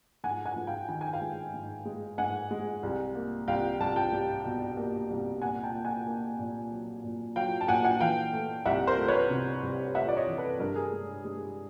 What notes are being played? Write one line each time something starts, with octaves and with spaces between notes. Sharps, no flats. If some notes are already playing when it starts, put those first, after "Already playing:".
G#2 F#5 G#5
F#5 G#5
G#2
F5 G5
D#3 G5
G#5
F5 G5
G#3
G#2
G#3
G#2 F#5 G#5
G#3
C2
A#3
C2 F5 G5
C2 A5
G5 A5
G3
B2
A#3
C2
A#2 F#5 G#5
G5 A5
A#3
F#5 G#5
A#3
A#2
F#3
A#2
F#3 F5 G5
A5
A#2 F#5 G#5
F#5 G#5
E3 F5 G5
A3
C2 E5 F#5
A#4 C5
A3
B4 C#5
C3
C2
A3 E5 F#5
D5
C#5 D#5
E3
A4 B4
G2 A#4
A4
G#4 A#4
G#3
G#3